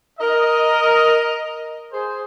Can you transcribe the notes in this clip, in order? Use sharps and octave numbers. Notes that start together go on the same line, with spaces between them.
A#4 D#5
G#4 C5